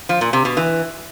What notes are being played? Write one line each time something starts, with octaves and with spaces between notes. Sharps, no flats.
F3
A#2
C3
B2
E3